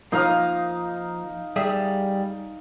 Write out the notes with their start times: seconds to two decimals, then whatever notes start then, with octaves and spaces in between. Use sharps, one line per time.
0.12 F3 A#3 D#4 F5 D#6
1.56 G3 G#4 E5